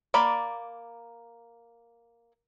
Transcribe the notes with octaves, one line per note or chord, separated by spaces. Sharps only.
A#3 D5 B5